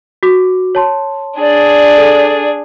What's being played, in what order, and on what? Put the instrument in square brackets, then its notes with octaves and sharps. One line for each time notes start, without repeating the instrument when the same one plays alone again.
[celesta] F#4 D6
C#5 A5 C6
[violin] D4 G#4 [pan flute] D5
[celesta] A4